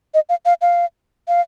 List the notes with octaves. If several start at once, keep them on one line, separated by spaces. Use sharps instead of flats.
D#5
F5
F5
F5
F5